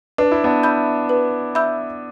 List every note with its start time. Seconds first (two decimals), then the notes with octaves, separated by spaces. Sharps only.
0.18 D4 B4
0.31 E4
0.44 B3 D4
0.63 E5 B5 E6 G6
1.09 B4
1.55 E5 B5 E6 G6